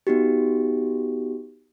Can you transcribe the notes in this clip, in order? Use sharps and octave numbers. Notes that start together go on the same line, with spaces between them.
B3 D#4 F#4 G4